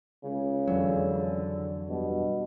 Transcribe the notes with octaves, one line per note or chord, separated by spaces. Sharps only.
C#2 C#3
F2 D3 E3 F#3
G2 B2